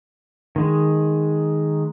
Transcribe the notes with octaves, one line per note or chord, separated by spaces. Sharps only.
D#3 G#3